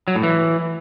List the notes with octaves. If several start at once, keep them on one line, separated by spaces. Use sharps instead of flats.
F#3
A2
E3